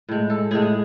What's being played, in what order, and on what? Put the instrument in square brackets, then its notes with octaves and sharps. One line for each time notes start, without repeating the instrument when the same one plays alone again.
[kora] A2 G#3
A4
A2 G#3 G#4
G#4